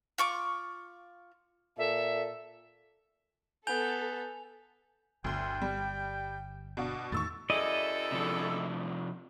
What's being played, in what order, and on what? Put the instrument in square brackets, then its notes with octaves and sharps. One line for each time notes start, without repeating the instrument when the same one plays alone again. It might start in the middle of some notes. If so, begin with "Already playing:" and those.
[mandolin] F4 C#6 D6
[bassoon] A#2 [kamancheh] A4 [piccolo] E5
[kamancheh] B3 [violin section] A4 [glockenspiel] G#5 F7 [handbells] G6
[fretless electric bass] G1 [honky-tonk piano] D2 C6 [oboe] G5
[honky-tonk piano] G3
B2 D4 F#4
[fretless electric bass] E2 A2 D#3 [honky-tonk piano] C#6 E6 A6
[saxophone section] F#2 G#4 A4 [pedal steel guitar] E4 D5 D#5
[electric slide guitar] C3 F3 D4